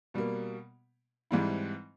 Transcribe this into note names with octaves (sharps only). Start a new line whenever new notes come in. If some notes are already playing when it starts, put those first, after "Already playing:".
B2 G3 A#3
G#2 E3 G3 C4 E4